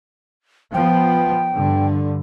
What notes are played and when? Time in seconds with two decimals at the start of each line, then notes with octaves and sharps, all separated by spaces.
0.74 F3 B3 G5
1.54 G2 D3